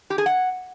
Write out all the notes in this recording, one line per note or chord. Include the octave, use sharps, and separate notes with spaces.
G4
G#4
F#5